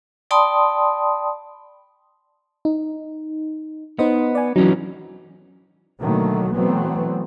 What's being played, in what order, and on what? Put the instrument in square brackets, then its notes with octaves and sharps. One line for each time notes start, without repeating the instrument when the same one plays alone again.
[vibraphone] D5 G5 A5 B5 C6 D#6
[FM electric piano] D#4
[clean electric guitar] B3 [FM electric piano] D#4 C5 D#5
[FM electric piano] D5 G#5
[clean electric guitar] E3 C#4 D#4 [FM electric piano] F#3
[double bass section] B2 D3 D#3 F#3 A3 A#3
B2 E3 F#3 A3 B3 C4